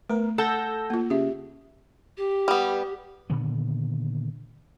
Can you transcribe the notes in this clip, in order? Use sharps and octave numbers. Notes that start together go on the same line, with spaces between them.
A3 B3 A#4
A4 F#5 E6 G6 A#6
A#3 F4
C#3 G4 E5
G4
G3 B3
A#2 D3 D#3 B3